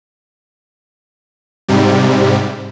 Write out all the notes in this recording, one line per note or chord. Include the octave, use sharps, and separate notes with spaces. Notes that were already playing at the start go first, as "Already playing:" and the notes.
G#2 C3 G3